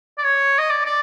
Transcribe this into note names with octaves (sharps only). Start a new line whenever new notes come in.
D5
C#5
D#5
D5
D5